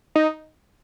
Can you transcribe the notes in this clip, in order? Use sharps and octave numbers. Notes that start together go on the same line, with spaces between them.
D#4